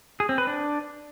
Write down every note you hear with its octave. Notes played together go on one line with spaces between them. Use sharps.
G#4
C4
B4
D4